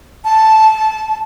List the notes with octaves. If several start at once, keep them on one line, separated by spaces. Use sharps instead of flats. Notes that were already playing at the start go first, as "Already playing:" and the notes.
A5